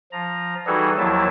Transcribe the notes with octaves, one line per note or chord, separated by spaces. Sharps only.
F3 A#5
E3 G3 D#4 F#4 G#4 A4
D#2 D#3 F3 F#3 E4 A5